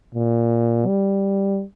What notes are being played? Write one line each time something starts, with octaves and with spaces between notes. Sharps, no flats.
A#2
G3